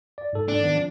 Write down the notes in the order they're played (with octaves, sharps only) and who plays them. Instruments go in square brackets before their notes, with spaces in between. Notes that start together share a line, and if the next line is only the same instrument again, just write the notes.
[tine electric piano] D5
G#2 A4
[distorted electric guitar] D4
[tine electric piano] D#3 B3
F3